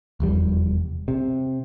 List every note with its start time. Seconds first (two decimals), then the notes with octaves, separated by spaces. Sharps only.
0.20 F1 E2 G3
1.08 C3